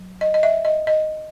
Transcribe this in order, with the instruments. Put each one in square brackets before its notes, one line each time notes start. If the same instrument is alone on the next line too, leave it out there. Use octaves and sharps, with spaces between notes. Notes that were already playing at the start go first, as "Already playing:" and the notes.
Already playing: [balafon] F#3
D#5
D#5
E5
D#5
D#5